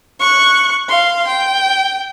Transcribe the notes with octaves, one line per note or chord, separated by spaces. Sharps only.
C#6 F#6
F5 C6
G5